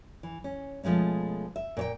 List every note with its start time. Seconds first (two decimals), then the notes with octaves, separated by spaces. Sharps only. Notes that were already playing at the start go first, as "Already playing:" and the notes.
0.23 E3
0.44 C#4
0.83 B2 F3 G#3 A3 C#4
1.56 E5
1.77 A#2 C#5 G5